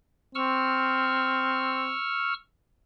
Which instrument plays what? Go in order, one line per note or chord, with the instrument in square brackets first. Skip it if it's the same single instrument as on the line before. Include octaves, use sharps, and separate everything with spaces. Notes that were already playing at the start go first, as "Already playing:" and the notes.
[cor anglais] C4 [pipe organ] C#6 E6 F6